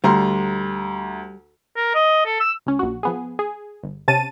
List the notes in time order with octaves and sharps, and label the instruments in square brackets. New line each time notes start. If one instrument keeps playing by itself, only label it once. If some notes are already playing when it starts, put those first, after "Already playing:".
[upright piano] D2 A#5 C6 [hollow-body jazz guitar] G3
[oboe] A#4
D#5
A4
E6
[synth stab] C#2 C#4
A#1 F#4
F3 B3 G#4
G#4
G1
C3 C#4 A5 A6 D#7